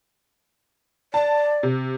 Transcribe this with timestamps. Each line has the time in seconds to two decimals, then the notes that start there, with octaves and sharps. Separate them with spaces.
1.14 D5 A5
1.63 C3